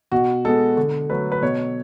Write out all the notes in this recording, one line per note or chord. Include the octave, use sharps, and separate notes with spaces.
B2 F#4
G#3 B3 A4
D3
F#3 A3 B4
B4
B2 C#5